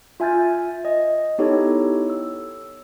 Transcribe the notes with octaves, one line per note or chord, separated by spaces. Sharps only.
F4 E5 G#5 F6 G6 A6
D#5
B3 D#4 E4 G4 A4 C#5
E6